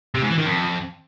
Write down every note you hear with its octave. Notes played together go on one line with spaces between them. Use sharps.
C3
G#2
E3
D#3
F2